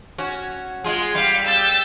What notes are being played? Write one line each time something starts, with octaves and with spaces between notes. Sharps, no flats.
C#4 F#4
G#3 F4 G#4
G3 F5
E6 G6 A6